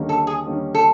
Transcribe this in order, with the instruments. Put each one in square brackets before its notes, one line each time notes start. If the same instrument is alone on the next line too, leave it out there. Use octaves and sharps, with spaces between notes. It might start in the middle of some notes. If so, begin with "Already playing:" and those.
Already playing: [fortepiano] D#2 D3 G3 A#3 C#4
[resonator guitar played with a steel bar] A4
G#4
[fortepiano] D#2 D3 G3 A#3 C#4
[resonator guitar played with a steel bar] A4